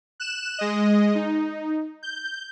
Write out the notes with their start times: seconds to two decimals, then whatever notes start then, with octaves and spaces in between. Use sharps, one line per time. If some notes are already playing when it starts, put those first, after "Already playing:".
0.20 F#6 E7
0.58 G#3 D#5
1.15 D#4
2.03 G6